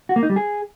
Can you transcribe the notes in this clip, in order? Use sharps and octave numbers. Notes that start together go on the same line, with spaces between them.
F#4
A#3
D#4
G3
G#4